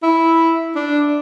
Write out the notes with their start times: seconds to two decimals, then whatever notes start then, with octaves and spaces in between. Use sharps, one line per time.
0.03 E4
0.75 D4